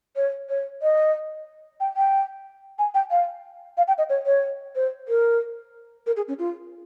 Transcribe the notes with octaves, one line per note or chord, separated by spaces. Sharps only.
C#5
C#5
D#5
G5
G5
G#5
G5
F5
F5
G5
D#5
C#5
C#5
C5
A#4
A#4
G#4
C#4
F4